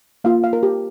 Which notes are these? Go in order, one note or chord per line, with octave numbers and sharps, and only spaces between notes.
A#3 F4 F5
F5
A#4
G4